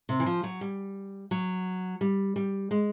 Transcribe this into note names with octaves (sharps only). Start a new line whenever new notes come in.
C3
E3
F3
F#3
G3
F#3
G3
G3
G#3